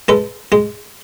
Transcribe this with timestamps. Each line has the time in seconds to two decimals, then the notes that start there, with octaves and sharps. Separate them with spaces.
0.08 G#3 A4 B4
0.52 G#3